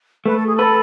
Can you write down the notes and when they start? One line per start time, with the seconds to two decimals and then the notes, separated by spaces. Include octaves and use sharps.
0.25 A3 B4
0.36 A4
0.45 G#4
0.54 A4 B4